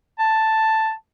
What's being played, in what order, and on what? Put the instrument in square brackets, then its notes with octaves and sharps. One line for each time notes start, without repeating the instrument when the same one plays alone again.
[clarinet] A5